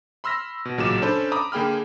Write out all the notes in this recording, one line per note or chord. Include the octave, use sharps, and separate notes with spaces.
B5 C6 E6 F6 A#6 B6
B2
A1 A#2 C#3 F#3 D6 E7
C#4 D4 A4 C5 B5
A#5 B5 D6 D#6
D3 A#3 G#4 G5 B5 F6